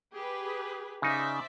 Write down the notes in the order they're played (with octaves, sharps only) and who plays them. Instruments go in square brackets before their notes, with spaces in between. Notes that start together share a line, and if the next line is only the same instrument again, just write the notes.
[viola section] G4 G#4 B4
[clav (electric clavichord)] C#3 D#4 [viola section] C5 D5 E5